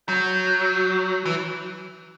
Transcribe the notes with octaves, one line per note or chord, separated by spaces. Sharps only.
F#3 G6
E3